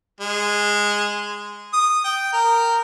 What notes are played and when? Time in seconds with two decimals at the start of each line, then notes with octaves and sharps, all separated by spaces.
0.21 G#3
1.73 D#6
2.04 G5
2.33 A#4